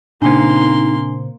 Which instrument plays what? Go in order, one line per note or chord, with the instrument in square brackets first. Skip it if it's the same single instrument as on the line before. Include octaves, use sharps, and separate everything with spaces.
[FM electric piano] A#2 C#3 C4 [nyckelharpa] A#3 C6 [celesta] D4 G#5 [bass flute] D#4